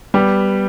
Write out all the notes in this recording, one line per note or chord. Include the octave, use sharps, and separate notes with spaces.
G3 B3 G4